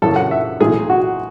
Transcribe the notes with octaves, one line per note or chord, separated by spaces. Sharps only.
F#2 C#3 E3 A4
F#5
E5
B1 A2 E3 G#4
F#4